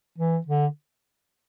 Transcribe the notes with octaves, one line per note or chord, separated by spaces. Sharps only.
E3
D3